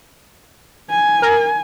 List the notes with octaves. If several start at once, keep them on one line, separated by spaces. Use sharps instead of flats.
G#5
A#4